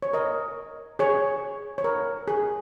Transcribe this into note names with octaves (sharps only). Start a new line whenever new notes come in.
C#5
A#4 D#5
G#4 C#5
C#5
A#4
G#4